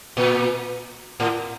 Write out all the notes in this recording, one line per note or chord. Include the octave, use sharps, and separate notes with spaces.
A#2
A2